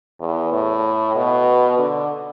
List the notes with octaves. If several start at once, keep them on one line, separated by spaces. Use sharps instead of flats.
E2
A2
B2
D3